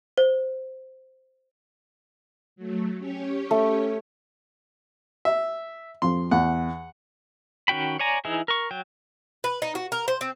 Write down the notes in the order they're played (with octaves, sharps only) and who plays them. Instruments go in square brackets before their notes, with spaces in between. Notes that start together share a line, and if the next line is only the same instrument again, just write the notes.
[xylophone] C5
[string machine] F#3 A3
C#4 G4 C#5
[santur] A3
[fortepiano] E5
[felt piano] F2 F3 [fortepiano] C6
[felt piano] E2 [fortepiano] F#5
[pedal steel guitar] D#3 C#4 F#4 G5 B5
C#5 D5 G#5 A#5
E3 D#4 E4 G#4
A#4 C#6
F#3 G5
[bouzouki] B4
D#4
F#4
A#4
C5
C4